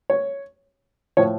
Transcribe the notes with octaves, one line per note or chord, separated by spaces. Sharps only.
C#5
A2 F3 C#5